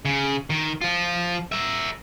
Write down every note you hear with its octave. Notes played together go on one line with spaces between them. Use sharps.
C#3
D#3
F3 F4
A#4 E5